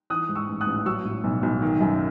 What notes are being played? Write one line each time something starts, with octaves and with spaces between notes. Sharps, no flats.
E3 D#6 F#6
G#2
C#6 E6
A1
D#6 F#6
A1
F#3 C#6 E6
A2
B1
B1
D#3
F#2